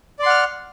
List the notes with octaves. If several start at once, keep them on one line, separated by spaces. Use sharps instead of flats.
D5 F#5 C6 F6